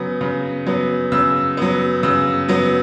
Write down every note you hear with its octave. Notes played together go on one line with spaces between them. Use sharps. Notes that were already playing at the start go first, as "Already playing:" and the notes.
Already playing: C#3 F#3 B3
C#3
F#3 B3
C#3 E6
F#3 B3
C#3 E6
F#3 B3